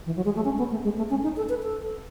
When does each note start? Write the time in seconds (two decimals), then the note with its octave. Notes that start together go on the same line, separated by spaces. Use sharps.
0.06 E3
0.16 F#3
0.25 G#3
0.36 A3
0.45 C#4
0.58 B3
0.71 A3
0.84 G#3
0.97 A3
1.10 C#4
1.23 D#4
1.37 A4
1.49 B4
1.63 A4